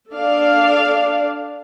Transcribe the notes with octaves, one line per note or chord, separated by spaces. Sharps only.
D4 A4 D5 F5